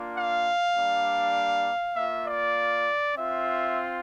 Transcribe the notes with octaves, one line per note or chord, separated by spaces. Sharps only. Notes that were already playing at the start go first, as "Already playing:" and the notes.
Already playing: A#3 D4 F4
F5
G3 A#3 D4
A#3 F4 E5
D5
C4 F4 E5